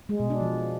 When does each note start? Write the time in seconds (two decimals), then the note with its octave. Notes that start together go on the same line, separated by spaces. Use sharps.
0.09 G#3
0.20 B2
0.30 D4
0.41 F3